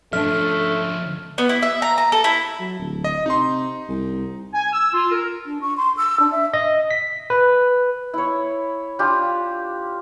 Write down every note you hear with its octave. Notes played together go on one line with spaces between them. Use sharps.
F3 A3 C#4 D4 E5 F6
B3
E4
E5
A#5
A#5
A4
E4
F#3
D1
D#5
C3 D#4 C6
C2
G#5
E6
F4
A#4
D4
C#6
C6
E6
D4
E5
D#5
B6
B4
E4 C#5
D4 F4 G4